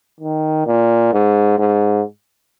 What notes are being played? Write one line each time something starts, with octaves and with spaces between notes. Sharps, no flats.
D#3
A#2
G#2
G#2